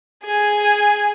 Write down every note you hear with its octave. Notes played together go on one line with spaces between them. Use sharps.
G#4 G#5